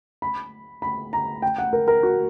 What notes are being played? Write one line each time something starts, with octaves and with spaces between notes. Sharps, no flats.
B5
B5
A#5
G5
F#5
A#4
A#4
F#4